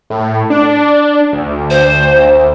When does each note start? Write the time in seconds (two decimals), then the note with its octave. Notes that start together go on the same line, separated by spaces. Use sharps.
0.10 A2
0.50 D4
1.33 D2
1.70 C5